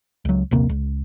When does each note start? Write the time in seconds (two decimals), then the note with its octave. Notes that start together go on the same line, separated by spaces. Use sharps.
0.25 C#2 F#3
0.51 A#1 D#2 C3 A#3
0.69 C#2